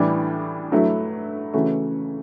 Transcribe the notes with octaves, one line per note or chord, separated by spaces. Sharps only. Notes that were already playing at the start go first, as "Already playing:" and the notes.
Already playing: A2 E3 G3 D4
G2 F#3 A3 E4
C#3 E3 A3 C#4 F#4